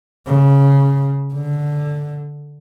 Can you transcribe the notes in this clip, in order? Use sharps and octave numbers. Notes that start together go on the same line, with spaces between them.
C#3
D3